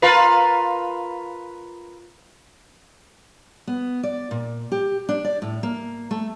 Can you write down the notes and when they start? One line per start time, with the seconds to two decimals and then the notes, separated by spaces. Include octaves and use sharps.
0.02 F4 A#4 B4
3.67 B3
4.03 D5
4.31 A#2
4.72 G4
5.09 D4
5.25 D5
5.42 A2
5.63 A#3
6.11 A3